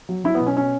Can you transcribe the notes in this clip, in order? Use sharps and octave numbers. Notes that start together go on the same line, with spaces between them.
F#3
F#3 E4
B3
B2
C#4
C#4